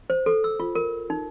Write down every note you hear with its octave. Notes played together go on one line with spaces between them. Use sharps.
C5
A4
E6
F4
A#4
D#4